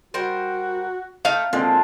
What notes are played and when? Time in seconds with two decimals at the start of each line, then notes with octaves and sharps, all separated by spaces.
0.14 G3 F#4 A#4 C5
1.25 A3 D#4 E4 F5
1.53 D3 G#3 A#3 C4 F4